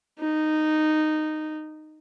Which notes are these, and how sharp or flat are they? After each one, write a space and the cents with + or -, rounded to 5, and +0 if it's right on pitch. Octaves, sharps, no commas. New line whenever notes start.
D#4 -10